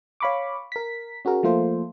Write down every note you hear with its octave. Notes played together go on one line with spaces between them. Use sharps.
C#5 F5 B5 C#6 D6
A#4 B6
C#4 F#4 G#4 A#4
F3 A3 A#3 F4 A4 C5